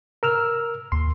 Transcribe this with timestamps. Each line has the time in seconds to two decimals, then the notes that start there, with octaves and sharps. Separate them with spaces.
0.23 A#4 E6 F6
0.92 D#2 C6